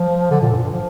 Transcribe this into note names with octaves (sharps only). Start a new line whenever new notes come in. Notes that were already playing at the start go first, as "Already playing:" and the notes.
Already playing: F3
D3
A#2
G2
A#2
G2
F3